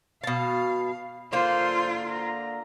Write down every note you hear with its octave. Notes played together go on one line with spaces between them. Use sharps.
B2 F5 A5
D3 A#3 F4 C5
A#5